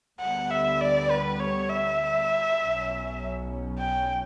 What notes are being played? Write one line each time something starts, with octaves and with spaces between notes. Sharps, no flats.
D2 D3 G3 B3 F#5
E5
D5
B4
C#5
E5
B1 B2 F#3 C#4
G5